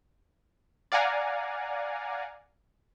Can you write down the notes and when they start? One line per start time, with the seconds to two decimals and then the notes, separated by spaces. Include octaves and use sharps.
0.92 D5 F5 F#5 G#5 A#5